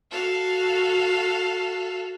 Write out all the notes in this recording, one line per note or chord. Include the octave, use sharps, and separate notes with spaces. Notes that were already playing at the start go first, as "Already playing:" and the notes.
F#4 A4 F5